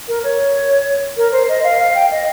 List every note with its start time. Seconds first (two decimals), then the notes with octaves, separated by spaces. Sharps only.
0.08 A#4
0.24 C#5
1.17 A#4
1.32 C5
1.49 D#5
1.64 F5
1.79 F5
1.95 G5
2.11 D#5